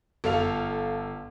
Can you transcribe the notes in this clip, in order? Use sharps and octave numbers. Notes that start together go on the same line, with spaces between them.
G1 A4 F5 F7